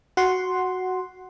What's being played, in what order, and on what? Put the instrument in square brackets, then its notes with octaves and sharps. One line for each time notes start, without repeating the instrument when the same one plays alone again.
[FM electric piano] F#4 F#5 C6